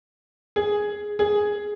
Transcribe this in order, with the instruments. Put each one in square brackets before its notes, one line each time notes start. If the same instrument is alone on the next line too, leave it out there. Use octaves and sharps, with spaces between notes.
[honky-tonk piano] G#4
G#4